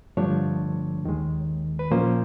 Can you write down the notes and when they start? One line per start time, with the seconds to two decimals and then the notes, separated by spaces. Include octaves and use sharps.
0.17 G2 D3 F3 A3 D4 C#5
1.04 D#2 D#3 G#3
1.79 B4
1.91 A#2 F3 A#3 C#4 C5